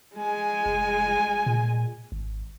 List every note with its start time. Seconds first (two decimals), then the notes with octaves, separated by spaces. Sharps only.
0.16 G#3 G#5
0.66 F1
1.46 A#2
2.12 G#1